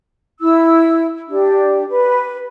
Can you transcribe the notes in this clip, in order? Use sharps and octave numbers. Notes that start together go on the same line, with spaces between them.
E4 E6
D4 G4
B4